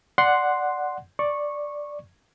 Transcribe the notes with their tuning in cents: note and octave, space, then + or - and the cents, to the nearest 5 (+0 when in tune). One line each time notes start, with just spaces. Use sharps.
D5 +0 F#5 +0 C6 +0
D5 +0 C#6 -15